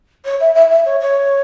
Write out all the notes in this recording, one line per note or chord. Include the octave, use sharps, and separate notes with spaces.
C#5
E5
E5
E5
C#5
C#5